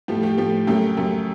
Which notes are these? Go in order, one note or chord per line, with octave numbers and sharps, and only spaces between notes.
A2 F3 A3 G4
G4
A2 F3 A3 G4
F#2 C#3 F#3 A3 G4
F#2 C#3 F#3 A3